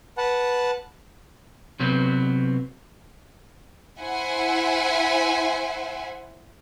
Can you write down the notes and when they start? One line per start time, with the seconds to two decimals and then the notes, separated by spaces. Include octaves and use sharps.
0.17 B4 F#5 A5
1.80 C3 F#3 B3 C4
4.00 E4 C5 E5 F#5 G#5